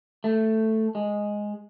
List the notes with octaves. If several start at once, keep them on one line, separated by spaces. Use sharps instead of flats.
A3
G#3